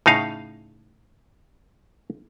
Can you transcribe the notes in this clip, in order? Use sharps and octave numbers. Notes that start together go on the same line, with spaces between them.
A2 C#3 D#4 F5